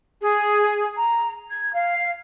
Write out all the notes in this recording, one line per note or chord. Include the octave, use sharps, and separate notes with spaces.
G#4
A#5
G#6
F5